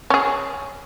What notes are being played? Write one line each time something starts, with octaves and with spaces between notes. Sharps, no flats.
C#4 G#4